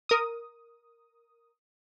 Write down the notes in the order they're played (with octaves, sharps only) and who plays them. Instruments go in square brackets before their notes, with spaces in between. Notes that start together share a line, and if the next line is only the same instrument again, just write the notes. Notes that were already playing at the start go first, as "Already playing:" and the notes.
[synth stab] A#4 D#6